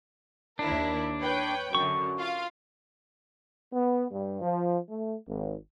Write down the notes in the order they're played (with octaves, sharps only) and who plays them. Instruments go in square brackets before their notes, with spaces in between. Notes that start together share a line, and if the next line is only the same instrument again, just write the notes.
[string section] D#2 E4 A#4 [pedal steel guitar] D4
[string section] B4 C#5 G5
[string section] F#2 D3 [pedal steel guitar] C#6
[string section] F4 F5
[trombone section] B3
G2
F3
A3
G#1